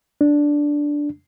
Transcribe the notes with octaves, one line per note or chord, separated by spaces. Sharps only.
D4